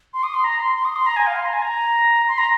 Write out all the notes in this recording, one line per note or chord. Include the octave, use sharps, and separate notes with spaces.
C6
D#6
C6
A#5
C6
C6
D#6
C6
A#5
G#5
F5
C6
A#5
G#5
A#5
C6
A#5